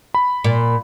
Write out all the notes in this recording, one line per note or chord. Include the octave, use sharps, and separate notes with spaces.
B5
A#2